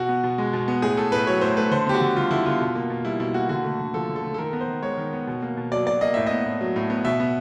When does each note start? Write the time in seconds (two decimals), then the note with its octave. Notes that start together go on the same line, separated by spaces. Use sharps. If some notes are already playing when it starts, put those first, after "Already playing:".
Already playing: B2 F#4
0.09 B3
0.24 B2
0.38 G#3
0.53 B2
0.68 B3
0.82 A2 G#4
0.97 A3 A4
1.12 A2 B4
1.27 F#3 C#5
1.41 A2 C5
1.57 A3 B4
1.71 D3 C5
1.86 B3 G4
1.94 F#4
2.01 D3
2.16 G3 F4
2.31 D3 E4
2.46 B3 F4
2.60 B2
2.75 A#3
2.90 B2
3.05 G3 E4
3.20 B2 E4
3.34 A#3 F#4
3.49 D3 F#4
3.64 A3
3.80 D3
3.94 F3 A4
4.09 D3
4.16 A4
4.23 A3
4.34 A4
4.38 D#3 A#4
4.53 B3
4.61 C5
4.68 D#3
4.82 G#3 C#5
4.98 D#3
5.13 B3
5.27 B2
5.42 A#3
5.57 B2
5.72 F#3 D5
5.86 B2 D5
6.01 A#3 D#5
6.14 A2 E5
6.26 B3 D#5
6.46 A2
6.61 F#3
6.76 A2
6.90 B3
7.05 B2 E5
7.20 B3